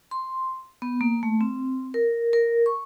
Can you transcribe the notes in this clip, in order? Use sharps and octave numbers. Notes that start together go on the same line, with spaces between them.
C6
B3
A#3
A3
C4
A#4
A#4
C#6